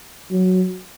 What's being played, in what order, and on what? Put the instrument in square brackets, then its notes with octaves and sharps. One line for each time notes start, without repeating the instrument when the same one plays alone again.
[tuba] F#3